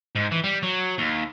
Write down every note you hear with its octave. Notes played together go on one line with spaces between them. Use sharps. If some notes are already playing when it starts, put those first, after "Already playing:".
G#2
E3
G3
F#3
D#2